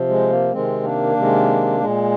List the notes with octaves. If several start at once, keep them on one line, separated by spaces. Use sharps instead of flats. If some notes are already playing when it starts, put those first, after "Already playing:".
Already playing: C3 F3
G#3
A#3
C3 D#3 G#3 C4
A#3 D4
C3 D#3 G#3
A#2 G#3